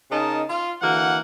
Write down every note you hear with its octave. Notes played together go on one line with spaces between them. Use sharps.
C#3 D#4 A#4 D#5 A5
F4
D3 E3 A#3 F#4 F#5